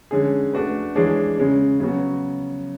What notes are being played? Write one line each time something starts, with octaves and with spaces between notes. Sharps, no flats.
D3 G#3 C#4 G#4
A3 D4 F#4 B4
E3 G#3 D4 G#4 C#5
C#3 G#3 C#4
C#3 F#3 B3 F#4